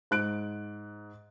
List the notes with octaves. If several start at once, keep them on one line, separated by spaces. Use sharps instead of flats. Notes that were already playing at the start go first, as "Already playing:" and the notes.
G#2 F#6 D7